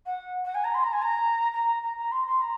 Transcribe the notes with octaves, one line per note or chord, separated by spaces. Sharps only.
F#5
F#5
G#5
A#5
C6
A#5
G#5
A#5
A#5
A#5
A#5
C6
C6
A#5